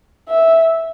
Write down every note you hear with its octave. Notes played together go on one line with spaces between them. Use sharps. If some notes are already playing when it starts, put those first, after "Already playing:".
E5